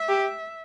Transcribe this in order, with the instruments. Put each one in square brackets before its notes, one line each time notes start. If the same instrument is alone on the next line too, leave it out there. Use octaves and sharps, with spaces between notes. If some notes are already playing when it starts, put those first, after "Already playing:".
Already playing: [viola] E5
[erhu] G4